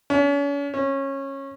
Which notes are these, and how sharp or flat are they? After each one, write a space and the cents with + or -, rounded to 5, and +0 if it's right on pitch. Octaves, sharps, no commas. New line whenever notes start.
C#4 +40
C#4 -20